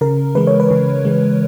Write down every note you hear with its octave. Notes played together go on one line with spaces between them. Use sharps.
C#3 A#4
E3 G#3 B4
C#5
B4
C#3
E3 G#3